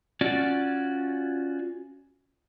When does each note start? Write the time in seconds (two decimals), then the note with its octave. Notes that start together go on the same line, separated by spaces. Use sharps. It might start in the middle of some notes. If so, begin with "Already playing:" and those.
0.21 C#4 F4 F#4 D5